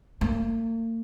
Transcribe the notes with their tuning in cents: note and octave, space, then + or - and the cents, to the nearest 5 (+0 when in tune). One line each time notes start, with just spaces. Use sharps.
A#3 -45